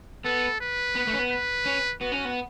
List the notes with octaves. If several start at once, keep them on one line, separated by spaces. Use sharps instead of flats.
B3 A4
B4
B3
A3
C#4
B3
B4
C#4
B3 F#4
C#4
B3